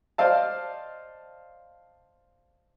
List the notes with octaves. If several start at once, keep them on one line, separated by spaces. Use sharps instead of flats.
C5 D5 D#5 F5 A5